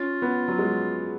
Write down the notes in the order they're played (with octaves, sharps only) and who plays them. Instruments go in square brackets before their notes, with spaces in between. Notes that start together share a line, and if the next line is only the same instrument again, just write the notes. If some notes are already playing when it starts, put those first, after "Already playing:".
Already playing: [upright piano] C#4 [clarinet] F4
[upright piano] B3
F#3
G#3